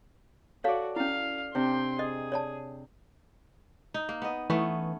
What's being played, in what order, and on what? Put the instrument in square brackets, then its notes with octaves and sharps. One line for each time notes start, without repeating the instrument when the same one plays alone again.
[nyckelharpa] F#4 [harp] A4 D5 [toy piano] C#5 F5
[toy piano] C#4 E4 [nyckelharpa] F5
[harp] C3 D4 [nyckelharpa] G5 C6
[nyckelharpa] G#4 [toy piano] D#5
[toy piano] C#5 D5 A5
[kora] D#4
A#3
B3 D#5
[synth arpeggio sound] E3 [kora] A3 B3 C#4